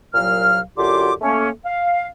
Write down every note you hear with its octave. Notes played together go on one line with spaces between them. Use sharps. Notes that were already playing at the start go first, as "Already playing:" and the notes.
C2 A#2 F#3 F5 F6
F#2 D3 F4 G4 C6 D6
A3 A#3 C#4
F5